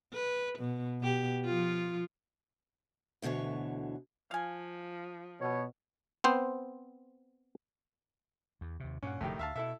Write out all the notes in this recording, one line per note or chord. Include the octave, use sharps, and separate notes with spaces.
B4
B2
B2 G4
F3 F4
D2 B2 D3 E3 C#5
F3 F5 G#5
B2 C#5
B3 C4 C5
E2
D#2 C3
G2 A#2 C#4 F#5
F1 F2 A2 D3 D#3 G4
D2 E5 F5 A5
B2 E4 A4 E5